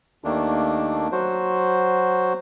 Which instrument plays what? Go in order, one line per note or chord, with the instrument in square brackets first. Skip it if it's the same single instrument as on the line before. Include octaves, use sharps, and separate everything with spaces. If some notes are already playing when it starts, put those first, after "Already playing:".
[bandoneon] D#2 D#3 A3 A#3 D4
F#3 F#4 C5